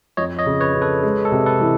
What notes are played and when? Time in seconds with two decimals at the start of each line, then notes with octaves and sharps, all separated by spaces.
0.17 F2 C#5 D#5
0.39 C#5 D#5
0.46 C#3
0.60 B4 C#5
0.75 C#3
0.82 A4 B4
1.03 G#3
1.25 A4
1.31 C3
1.46 A4 B4
1.61 E3